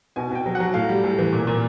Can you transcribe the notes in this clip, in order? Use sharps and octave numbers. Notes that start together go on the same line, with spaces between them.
B2 G#5
B2 G5
F#3
F#5
F#3
A2 F5
G3
A2
E3
A#2
A#2